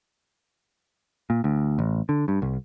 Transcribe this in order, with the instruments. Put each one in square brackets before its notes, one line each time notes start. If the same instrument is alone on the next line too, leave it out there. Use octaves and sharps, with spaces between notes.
[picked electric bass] A#2
D2
A1
D3
G2
C2